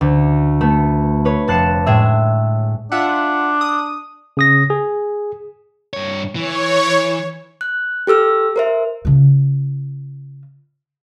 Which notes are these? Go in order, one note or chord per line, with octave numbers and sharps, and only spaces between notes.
D2
A3 B3
B4 C#5
F1 A5 F#6 C7 C#7 E7
A2 G#3 G#4 E5
D4 F4 E5 F#5
D#6
C#3 D#6 A#6
G#4
G2 C#5
E3 C#5
F#6
G4 A4 E6 F6
A#4 C5 E5
C#3 F4